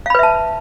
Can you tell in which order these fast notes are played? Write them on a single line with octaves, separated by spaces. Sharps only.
F5 B5 B4 E5 A5